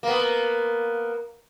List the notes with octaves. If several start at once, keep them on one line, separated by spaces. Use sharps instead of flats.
A#3 B3